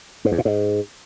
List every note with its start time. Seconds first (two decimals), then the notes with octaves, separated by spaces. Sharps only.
0.25 G#2
0.32 E2
0.38 A#2
0.45 G#2